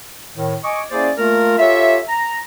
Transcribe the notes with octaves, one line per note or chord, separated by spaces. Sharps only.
A2 D#3
D#5 G#5 C#6 D6
A#3 C#4 E4 G#4 C5 D5
A3 A#3 F4 A#4
F4 G4 A4 C#5 E5
A#5